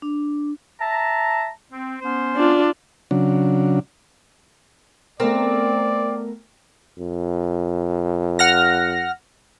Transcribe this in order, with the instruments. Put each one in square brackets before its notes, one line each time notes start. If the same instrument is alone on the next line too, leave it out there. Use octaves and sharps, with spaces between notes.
[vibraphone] D4
[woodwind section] E5 A5 A#5
C4
B3 C#4 C5
[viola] D4 F4
[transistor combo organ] C#3 F#3 D4
[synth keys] A3 B3 A#4 [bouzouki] C4 [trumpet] D5
[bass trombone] F2
[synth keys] F#5 F6 A#6